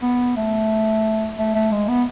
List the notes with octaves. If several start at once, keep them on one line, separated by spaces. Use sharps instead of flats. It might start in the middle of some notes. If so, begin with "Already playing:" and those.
B3
A3
A3
A3
G#3
B3